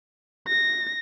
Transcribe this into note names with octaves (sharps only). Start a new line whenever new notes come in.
A#6